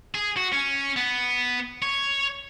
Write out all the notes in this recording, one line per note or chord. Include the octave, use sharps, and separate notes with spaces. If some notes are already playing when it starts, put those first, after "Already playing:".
G#4
F#4
C#4
B3
C#5